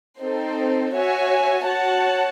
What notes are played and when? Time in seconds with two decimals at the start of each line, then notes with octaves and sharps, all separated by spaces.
0.19 C4 D#4 A4 C5
0.94 F#4 C#5 E5 G#5
1.66 F#4 C#5 F#5 A5